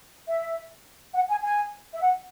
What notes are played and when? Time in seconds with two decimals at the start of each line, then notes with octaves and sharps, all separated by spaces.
0.28 E5
1.14 F#5
1.29 G#5
1.43 G#5
1.92 E5
2.01 F#5